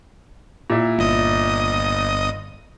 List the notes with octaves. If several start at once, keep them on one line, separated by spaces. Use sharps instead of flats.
A#2 E4
G1 D#5 D#6